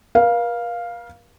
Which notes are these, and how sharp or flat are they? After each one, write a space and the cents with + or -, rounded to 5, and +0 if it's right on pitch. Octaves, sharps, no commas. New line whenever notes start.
A#4 +45 F5 +0